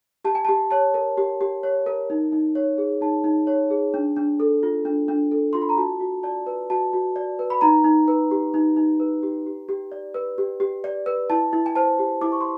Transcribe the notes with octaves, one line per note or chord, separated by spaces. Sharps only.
G4 A5
G#5
G4 A5
C#5 A5
A#4
G4
G4
C#5
A#4
D#4
D#4
C#5
G#4
D#4 A5
D#4
C#5
G#4
D4
D4
A4
F4
D4
D4
A4
F4 C6
B5
A#5
F#4 A5
F#4
D5 A5
B4
F#4 A5
F#4
D5
B4
B5
D#4 A#5
D#4
B4
G4
D#4
D#4
B4
G4
G4
G4
D5
B4
G4
G4
D5
B4
E4 A5
E4
G#5
C5 A5
G4
E4 D6
C#6
C6